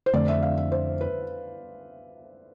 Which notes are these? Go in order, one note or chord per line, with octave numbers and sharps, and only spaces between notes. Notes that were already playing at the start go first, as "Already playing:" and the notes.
C5
F2 D3 A3 C4 D5
E5
F5
E5
C5
B4